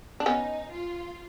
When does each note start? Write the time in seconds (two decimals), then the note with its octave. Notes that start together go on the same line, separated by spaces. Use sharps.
0.20 D4
0.26 B3 C#4 D#4
0.71 F4